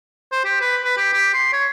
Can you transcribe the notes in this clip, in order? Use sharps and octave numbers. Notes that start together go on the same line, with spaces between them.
C5
G4
B4
B4
G4
G4
C6
C#5